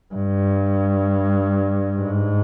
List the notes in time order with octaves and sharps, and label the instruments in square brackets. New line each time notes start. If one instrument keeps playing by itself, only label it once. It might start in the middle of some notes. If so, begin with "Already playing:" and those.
[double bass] G2
G#2